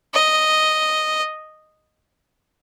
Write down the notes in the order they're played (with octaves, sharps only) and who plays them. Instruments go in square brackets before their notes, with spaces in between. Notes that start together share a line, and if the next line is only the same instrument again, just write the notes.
[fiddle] D#5